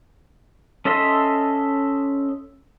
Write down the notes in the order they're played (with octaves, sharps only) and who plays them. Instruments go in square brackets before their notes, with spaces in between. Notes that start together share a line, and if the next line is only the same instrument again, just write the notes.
[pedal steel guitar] C#4 A4 D#5 E5 C6